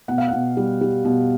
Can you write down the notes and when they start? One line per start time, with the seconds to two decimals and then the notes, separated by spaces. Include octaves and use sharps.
0.08 B2 F#5
0.18 F5
0.28 B2 F#5
0.57 G3
0.81 G3
1.05 B2